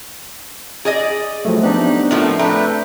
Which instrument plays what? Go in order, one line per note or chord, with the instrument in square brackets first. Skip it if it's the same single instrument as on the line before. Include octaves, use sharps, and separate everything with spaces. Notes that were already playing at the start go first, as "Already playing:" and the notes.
[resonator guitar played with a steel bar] G#4 D5 D#5
[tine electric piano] F3 F#3 A3
[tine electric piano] B3 C4 D4 [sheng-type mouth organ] D#4 G4 F#6
[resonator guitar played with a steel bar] A2 F3 A3 [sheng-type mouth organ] A#4
[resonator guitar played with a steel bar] A3 [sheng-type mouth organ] D4 B4 G5 [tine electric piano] A#5